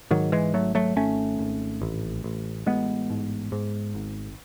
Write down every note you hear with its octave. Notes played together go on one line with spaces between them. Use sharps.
G#2 D#3 F#3
E3 G#3
G#1 F#3 A3
F#3 A3
G#1 A3 C#4
G#1
A1
A1
A1 G#3 B3
G#2
G#2
G#1